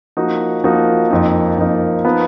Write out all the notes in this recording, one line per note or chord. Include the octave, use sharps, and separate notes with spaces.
F3 A#3 D#4 F#4
F3 A#3 D#4 F#4
F2 F3 A#3 D#4
F2 F3 A#3 D#4
F3 B3 D#4